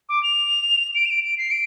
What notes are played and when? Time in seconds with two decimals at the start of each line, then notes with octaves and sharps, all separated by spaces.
0.09 D6
0.23 F7
0.95 D7
1.06 F7
1.10 D7
1.24 D7
1.38 C7
1.51 D7